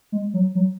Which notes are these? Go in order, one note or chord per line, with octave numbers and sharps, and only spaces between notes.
G#3
F#3
F#3